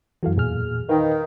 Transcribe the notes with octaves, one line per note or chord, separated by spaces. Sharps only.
F#2 E3 F#4 A4 F5
E2 A#2 G#4 F6
D#3 B4 F5 G5